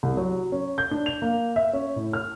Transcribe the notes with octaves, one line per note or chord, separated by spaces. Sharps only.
C2
F#3
C#4
G6
D4
F7
A#3
E5
C#4
A2
F6